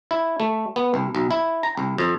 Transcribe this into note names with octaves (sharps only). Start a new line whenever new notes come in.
E4
A3
B3
C2
B1
E4
A#5
C2
F2